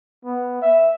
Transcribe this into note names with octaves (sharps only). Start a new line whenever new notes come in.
B3
E5